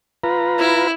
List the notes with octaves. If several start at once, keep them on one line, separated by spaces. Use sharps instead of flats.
F4 B4 A#5
E4